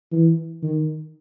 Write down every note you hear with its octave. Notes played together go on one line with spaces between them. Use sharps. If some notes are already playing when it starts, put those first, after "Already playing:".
E3
D#3